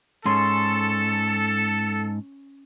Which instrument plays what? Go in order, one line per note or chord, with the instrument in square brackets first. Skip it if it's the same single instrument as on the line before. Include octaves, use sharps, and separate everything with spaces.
[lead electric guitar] G#2 [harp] C#4 C6 [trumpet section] A4